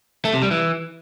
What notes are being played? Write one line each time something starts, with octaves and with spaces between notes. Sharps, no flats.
A3
C3
G3
E3